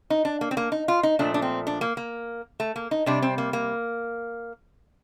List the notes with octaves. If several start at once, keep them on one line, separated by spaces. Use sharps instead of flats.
D#4
D4
A#3
C4
A#3
D#4
F4
D#4
A#2 F3 A3 D4
D4
C4
D4
A#3
A#3
A3
A#3
D#4
C3 G3 D4
C4
A#3
A#3